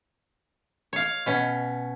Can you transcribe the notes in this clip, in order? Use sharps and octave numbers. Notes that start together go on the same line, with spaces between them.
C#5 F5
B2 C#4